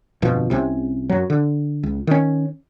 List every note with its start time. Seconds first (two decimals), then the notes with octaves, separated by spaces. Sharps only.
0.22 G1 F2 B2 F3
0.50 C2 C3 D#3 C#4
1.09 F#2 F#3
1.30 D3
1.83 C#2
2.07 D#3 C#4